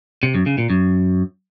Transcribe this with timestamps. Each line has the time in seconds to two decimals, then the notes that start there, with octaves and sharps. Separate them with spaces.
0.23 C3
0.35 F#2
0.46 C#3
0.58 A#2
0.70 F#2